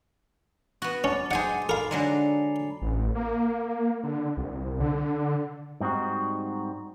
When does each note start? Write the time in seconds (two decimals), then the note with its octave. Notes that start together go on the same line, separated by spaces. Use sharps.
0.82 B3 F#4
1.04 C#4 A5 D6 A6
1.31 D#4 G#4 C5 F#5 G#5
1.69 A#4 F5 A#5 B5 C7
1.91 D3 F#3 G#3 G#5 C#7 F7
2.82 A1
3.15 A#3
4.03 D3
4.37 C2
4.80 D3
5.80 G#2 G3 C4 D#4 F#4